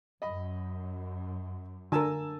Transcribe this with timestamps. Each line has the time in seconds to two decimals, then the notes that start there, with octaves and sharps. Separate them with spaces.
0.22 F#2 D#5 B5
1.92 D3 A#4 G#5 A5 E6